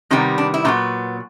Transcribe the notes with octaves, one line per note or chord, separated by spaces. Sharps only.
C3 D#3 G3 B3 D#4
D4
E4
A#2 F#3 B3 D#4